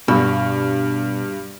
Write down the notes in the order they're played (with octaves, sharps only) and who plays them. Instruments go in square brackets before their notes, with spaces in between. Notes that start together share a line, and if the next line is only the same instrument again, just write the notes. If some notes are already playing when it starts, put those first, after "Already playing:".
[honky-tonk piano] G2 [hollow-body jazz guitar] B2